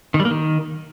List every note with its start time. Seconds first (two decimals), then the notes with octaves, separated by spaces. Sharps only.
0.14 D#3
0.20 G3
0.25 A#3
0.31 D#3